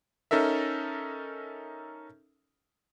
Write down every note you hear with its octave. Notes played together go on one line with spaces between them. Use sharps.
C#4 D#4 A4 A#4 E5